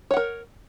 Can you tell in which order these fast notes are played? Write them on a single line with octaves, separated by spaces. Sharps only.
C#5 F#5 A#4